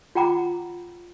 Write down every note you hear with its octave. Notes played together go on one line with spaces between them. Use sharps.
F4 F#5 G5 A#5 B5 D6